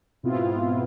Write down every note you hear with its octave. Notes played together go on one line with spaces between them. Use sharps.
G#2 B2 B3 C4 E4 F4